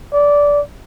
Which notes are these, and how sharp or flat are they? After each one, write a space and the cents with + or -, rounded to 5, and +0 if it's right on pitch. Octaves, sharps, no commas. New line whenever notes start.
D5 -15